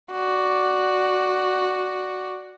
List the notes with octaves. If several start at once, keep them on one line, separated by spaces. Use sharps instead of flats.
F#4 D5